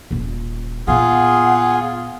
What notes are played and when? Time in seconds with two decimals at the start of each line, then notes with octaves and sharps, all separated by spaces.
0.11 D#1 C#4
0.87 A#2 B3 F4 G#4 F#5